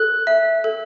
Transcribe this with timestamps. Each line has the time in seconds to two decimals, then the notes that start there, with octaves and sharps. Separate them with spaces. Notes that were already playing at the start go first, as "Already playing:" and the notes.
Already playing: A4 F#6
0.27 E5
0.64 A4